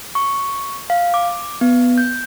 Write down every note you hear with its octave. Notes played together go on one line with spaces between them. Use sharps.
C#6
F5
D6
B3
G6